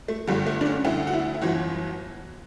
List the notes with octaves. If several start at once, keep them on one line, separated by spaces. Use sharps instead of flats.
A3
G1 G2 D3 G3
A3
D4
C#4
D2 D3 E4
F#4
E4
E4
G1 F#2 E3 F#4